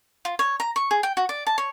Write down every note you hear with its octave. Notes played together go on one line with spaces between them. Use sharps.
F4
C#5
A#5
C#6
G#4
G5
F#4
D5
A5
C#5